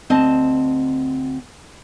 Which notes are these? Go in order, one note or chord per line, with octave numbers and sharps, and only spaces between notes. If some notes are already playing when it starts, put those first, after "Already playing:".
D2 C4 D#5 A5